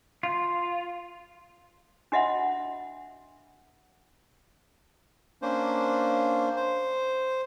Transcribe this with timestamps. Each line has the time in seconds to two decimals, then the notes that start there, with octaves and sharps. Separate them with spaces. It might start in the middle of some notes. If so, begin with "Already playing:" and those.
0.23 F4
2.12 D4 F#4 D#5 E5 F#5 B5
5.42 A#3 C#4 D4 C5
6.56 C5